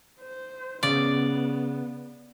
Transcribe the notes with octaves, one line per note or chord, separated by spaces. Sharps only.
C5
C#3 B3 D5